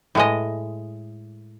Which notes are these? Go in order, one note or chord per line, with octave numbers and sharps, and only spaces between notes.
A2 G#3 D#5